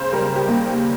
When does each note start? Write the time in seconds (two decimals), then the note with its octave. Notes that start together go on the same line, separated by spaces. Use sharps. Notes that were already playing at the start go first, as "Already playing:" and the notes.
Already playing: C#3 C5
0.13 G3 A#4
0.36 G4
0.48 D#2